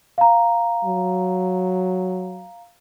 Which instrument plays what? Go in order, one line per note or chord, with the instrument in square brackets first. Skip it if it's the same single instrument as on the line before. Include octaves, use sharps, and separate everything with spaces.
[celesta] F5 A#5
[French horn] F#3